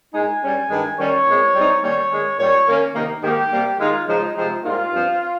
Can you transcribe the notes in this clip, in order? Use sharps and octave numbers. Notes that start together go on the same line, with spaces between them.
A#2 G#3 D#4 G#5
G2 G3 C#4
G2 D#3 G#3 D#4
D#3 G3 C#4 C#5
A#2 G#3 C4
G#2 G3 C4 D#4
D#3 G3 A#3 C#4 C#5
D#3 G#3 C#4
A#2 G3 C#4 C#5
D#3 A#3 C#4
C3 D#3 A#3 D#4
G#2 D#3 A#3 G4
C3 G3 A#3
D#3 G#3 D#4 F4
C#3 F3 G#3 D#4
C3 F3 G#3 C4 D#4
G#2 G3 A#3 D#4 F4
G2 F3 C4